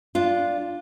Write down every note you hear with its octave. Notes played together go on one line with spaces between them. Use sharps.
D4 F4